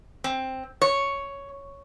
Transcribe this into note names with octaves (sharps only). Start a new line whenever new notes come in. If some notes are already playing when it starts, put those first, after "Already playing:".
C4
C#5